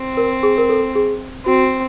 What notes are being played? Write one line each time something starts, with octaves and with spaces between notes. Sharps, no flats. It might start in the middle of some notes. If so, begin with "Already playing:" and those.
Already playing: C4
A#4
G#4
A#4
A4
G#4
C4 F#4